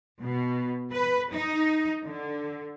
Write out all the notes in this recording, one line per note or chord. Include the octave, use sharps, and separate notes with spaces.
B2
B4
D#4
D3